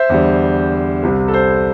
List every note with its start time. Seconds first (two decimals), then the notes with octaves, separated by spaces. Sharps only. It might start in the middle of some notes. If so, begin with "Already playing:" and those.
Already playing: C5 E5
0.09 E2 D3 G3
1.03 C2 C3 G3
1.28 A4
1.34 C5